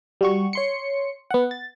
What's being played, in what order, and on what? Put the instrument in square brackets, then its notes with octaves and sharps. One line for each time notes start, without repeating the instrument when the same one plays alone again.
[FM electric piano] G3 F#4 C#6
C#5 C6 C#7
B3 F#5
A6